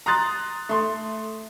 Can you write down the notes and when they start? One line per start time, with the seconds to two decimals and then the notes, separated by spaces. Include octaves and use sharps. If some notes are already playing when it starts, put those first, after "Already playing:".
0.06 A#5 C6 D#6 F#6 A6
0.69 A3 C6